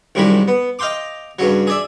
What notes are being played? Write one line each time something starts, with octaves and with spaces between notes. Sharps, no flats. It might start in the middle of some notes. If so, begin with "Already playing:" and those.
C2 F#2 D#3 G3 G#3 B5
B3
D#5 F5 G5 C6 D6
G2 C#3 F#3
G#4 D5 E5